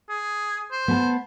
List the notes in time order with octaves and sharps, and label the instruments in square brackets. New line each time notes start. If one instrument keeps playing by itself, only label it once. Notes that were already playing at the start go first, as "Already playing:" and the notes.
[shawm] G#4
C5
[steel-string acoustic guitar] B3 A5